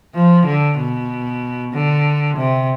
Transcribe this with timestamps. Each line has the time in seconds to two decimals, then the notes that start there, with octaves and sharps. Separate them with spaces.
0.15 F3
0.46 D3
0.78 B2
1.73 D3
2.38 C3